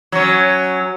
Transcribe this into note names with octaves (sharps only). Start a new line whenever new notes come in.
F#3 C#4